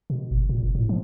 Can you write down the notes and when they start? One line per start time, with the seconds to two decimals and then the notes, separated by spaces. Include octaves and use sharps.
0.10 B2
0.31 G1
0.49 A#2
0.63 F#1
0.75 A2
0.89 F3